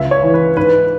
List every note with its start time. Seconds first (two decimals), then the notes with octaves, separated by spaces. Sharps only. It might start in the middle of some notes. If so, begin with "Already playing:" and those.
Already playing: C#2 E5
0.11 C#5
0.23 E3
0.34 B4
0.57 G#2 B4